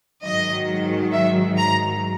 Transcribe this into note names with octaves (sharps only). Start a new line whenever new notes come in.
G#2 D#3 F#3 D#5
E5
A#5